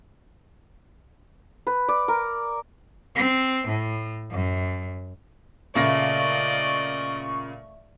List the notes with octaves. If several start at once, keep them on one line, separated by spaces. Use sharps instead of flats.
B4
D5
A#4
C4
A2
F#2
A#2 C#3 A3 D5 D#5 C#6 A#6